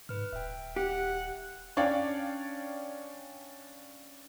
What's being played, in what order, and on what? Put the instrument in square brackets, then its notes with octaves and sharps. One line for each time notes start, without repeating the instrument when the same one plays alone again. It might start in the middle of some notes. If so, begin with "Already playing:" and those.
[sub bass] G#2 [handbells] B4 F6
[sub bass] D#1 [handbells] E5 G5
[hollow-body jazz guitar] G4 [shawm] F#5
[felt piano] C#4 D4 C#5 D5 F5 G5